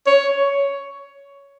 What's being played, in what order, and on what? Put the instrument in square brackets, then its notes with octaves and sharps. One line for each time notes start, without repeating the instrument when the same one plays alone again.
[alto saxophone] C#5